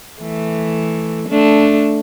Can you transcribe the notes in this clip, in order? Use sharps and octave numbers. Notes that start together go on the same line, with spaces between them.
E3 A3
A3 D4